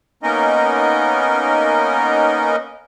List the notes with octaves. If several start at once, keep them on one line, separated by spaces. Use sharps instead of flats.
A#3 B3 C#4 D#4 A#4 D#5